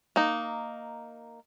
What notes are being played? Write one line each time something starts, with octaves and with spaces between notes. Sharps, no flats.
A#3 D#4